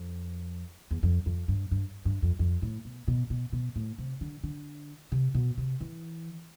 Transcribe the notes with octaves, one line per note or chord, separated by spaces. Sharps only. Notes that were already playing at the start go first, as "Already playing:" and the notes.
Already playing: F2
E2
F2
F2
G2
G2
G2
F2
F2
A2
B2
B2
B2
B2
A2
C3
D3
D3
C3
B2
C3
E3